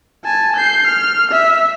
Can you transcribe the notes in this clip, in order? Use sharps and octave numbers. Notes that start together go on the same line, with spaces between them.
G#5 A5
G6 C7
F6
E5